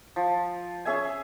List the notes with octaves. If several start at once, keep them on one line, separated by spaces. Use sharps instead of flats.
F3
C#4 G#4 E5 G#5